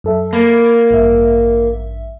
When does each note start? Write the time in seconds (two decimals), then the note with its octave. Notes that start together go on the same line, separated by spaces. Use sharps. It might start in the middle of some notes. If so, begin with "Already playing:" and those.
0.04 F#2 A4 E5
0.33 A#3 B5 G#6 A6
0.91 A1 G2 E5